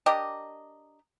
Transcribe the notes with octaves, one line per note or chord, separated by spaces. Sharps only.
D4 G4 A#4 D#5